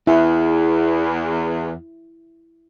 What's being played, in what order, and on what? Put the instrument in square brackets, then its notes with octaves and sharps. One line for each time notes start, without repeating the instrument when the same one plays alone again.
[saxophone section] E2 [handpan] E4